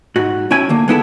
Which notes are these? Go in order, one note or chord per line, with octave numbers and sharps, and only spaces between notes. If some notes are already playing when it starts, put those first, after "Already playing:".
G#2 F#4
B1 C#4 E4 G5 G#5
D3 A#3
G#3 B3 E4 A4